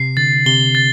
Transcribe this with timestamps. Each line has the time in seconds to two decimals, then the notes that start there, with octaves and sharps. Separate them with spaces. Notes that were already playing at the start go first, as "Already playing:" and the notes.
Already playing: C3 C7
0.17 D3 A6
0.46 C3 G7
0.75 A6